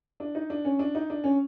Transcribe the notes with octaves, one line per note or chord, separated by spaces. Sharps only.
D4
D#4
D4
C#4
D4
D#4
D4
C#4